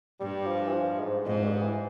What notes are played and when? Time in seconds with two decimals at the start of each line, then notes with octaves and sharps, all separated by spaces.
0.20 G2 G3
0.47 F3
0.68 E3
0.74 F3
1.00 G#2
1.26 F2 G#2
1.45 G2
1.62 E3